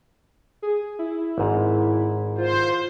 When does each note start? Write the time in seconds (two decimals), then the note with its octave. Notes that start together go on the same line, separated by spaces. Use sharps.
0.62 G#4
0.99 E4
1.38 G#1 G#2
2.38 F4 C5